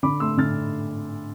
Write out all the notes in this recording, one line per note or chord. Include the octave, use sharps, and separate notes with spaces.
D3 B5 D6
A3 C6 E6
D3 F6 A6